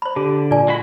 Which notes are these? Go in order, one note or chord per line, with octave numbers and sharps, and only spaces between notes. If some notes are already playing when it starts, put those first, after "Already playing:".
C5 B5
D3 G4
A#2 D5 G#5
G#3 F#4 B5